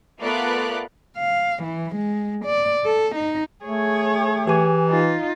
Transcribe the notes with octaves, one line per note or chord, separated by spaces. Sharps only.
A3 B3 F4 A#4 D5 F#6
F5
E3
G#3
D5
A4
D#4
A3 G#4 C#5
E3 G4 G#5
D#4 F4